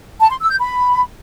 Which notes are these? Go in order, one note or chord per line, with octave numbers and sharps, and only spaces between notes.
A5
C6
E6
G6
B5